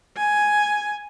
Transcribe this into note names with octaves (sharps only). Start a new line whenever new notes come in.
G#5